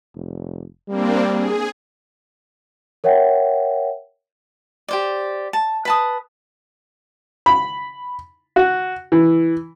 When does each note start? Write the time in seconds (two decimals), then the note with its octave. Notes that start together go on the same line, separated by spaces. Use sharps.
0.15 F1
0.88 G3 A#3 C4 D4
1.32 G#4
3.04 A#4 C#5 E5 F#5 G5
4.89 G4 C5 D5
5.53 A5
5.85 B4 A5 D#6
7.46 B5
8.56 F#4
9.12 E3